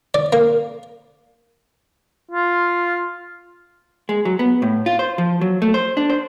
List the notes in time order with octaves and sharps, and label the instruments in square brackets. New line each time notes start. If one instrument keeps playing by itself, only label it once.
[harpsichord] D5
A#3
[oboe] F4
[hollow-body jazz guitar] G#3
F#3
B3
A2
F4
C5
F3
F#3
A3
C5
D4
C5